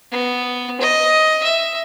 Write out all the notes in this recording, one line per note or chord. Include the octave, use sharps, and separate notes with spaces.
B3
D#5
E5